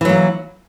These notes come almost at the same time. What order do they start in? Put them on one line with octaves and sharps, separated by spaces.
E3 F#3 A#3